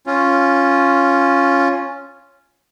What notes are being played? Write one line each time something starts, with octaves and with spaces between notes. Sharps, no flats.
C#4 F4